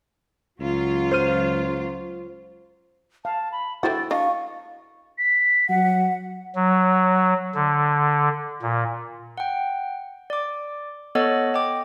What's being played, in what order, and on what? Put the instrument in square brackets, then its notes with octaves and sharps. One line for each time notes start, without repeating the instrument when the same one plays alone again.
[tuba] C#2 [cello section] F#3 F4
[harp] C5 F6 D#7
[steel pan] F5 [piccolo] A5
[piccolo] B5
[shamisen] D3 C5 F#5 [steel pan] E4 F#4 G5 [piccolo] A6
[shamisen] D4 D#5 [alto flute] F5 [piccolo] C#6
[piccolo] B6
[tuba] F#3 [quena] F#5
[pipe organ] F#3
D3
A#2
[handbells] F#5 G5
D5 D6
B3 A4 C#5 D#5 F#5 A6
D#5 G5 D6